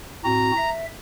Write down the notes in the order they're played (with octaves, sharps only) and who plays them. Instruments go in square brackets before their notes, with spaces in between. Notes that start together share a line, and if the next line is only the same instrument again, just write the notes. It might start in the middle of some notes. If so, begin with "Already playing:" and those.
[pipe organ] A2 C4 F#4 [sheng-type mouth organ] A#5
[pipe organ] E5